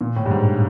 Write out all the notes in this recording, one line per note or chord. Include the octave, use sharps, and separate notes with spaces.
A#2
A2
G2
G#2